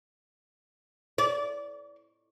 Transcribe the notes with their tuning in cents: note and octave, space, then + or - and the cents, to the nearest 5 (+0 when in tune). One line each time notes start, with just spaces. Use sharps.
D5 -25